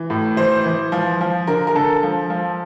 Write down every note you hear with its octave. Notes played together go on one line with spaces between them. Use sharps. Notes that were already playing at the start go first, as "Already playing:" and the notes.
Already playing: E3
A2
E3 C5
E3
F3
F3
D3 A#4
A#4
D3 A4
F3
F3